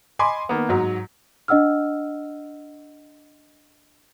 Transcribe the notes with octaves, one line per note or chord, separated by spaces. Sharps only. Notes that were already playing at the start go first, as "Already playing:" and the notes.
D#5 G#5 B5 C6 D6
D#3 A#3 B3
G#2 F#3
D4 D#5 F#5 E6 F6